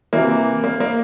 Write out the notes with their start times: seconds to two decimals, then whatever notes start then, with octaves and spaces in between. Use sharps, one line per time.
0.13 C3 E3 A#3
0.64 A#3
0.80 A#3